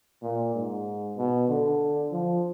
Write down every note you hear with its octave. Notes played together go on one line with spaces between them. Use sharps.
A#2
G#2
B2
D3
F3